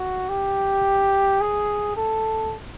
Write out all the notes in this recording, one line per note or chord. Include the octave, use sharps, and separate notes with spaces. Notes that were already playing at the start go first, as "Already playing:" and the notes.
Already playing: F#4
G4
G#4
A4